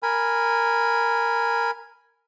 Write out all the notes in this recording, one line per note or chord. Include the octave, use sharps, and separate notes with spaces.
A#4 G#5 B5